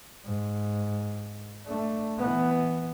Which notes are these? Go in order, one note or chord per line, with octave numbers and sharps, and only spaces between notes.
G#2
A3 D4
E3 B3